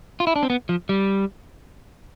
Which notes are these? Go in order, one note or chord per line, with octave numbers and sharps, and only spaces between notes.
F4
E4
D4
C4
B3
F3
G3